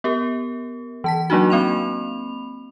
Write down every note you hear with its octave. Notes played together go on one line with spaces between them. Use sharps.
B3 G4 A#4
E3 A5 B6
F#3 A#3 D4 D#4 F#4
A#3 C4 B5 F7